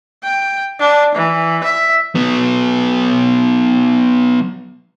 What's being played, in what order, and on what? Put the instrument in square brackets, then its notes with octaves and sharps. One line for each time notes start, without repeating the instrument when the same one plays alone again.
[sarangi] G5
D4
E3
E5
[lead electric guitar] F#3 B3